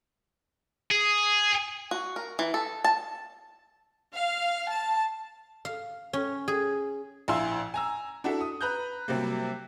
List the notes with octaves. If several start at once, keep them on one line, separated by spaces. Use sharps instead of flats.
G#4
F#4
A#4
E3
A4
A5
F5
A5
F5
C#4
G#4
A#1 E4 F5 G#5 C6 E6
G#5 A#5 E6
D4 E4 F#4 A4 E5
D#6
B4 A#5 F#6 G6
C3 F#3 G3 A#3